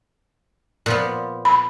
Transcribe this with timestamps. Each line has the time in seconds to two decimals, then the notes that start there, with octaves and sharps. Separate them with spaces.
0.86 A#2 F3 B3
1.45 B5